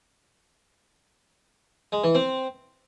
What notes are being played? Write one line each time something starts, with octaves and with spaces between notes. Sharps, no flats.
G#3
E3
C4